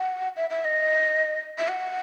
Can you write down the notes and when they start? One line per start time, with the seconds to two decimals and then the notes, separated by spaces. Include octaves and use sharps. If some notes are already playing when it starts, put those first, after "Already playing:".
Already playing: F#5
0.37 E5
0.50 E5
0.65 D#5
1.58 E5
1.68 F#5